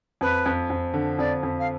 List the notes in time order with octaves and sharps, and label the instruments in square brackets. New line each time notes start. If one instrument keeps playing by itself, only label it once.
[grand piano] F2 [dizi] B4
[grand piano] F2
F2
D3
[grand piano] F2 [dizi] D5
[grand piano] F2
[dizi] F5